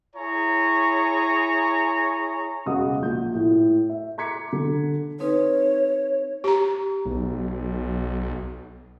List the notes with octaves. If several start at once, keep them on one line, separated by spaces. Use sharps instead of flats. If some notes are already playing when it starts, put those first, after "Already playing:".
E4 G#4 C#5 G#5 A#5 C#6
E1 C#3 F#4 D#5 D#6
A#1 G6
A2 E4
E5
A#5 D6 G#6 B6 C#7
D3
C4 D#4 B4 C#5
G4 A#5
B1